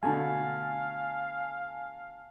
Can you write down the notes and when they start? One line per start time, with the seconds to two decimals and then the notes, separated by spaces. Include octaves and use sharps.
0.03 B2 D3 A3 F5 G#5 A5